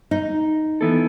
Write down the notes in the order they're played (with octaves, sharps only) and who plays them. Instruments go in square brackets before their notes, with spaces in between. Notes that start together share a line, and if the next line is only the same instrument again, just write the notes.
[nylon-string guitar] D#4
[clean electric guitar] E3 B3 E4 A4